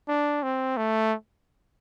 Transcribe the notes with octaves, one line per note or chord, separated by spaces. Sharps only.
D4
C4
A3